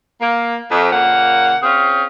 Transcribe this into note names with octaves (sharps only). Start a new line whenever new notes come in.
A#3
F2
A#2 C#3 A#3 F#5
C4 C#4 F4 G#4